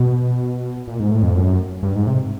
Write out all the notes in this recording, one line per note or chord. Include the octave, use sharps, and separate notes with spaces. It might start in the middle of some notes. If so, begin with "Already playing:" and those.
Already playing: B2
A#2
G#2
A2
F2
F#2
G2
G#2
C3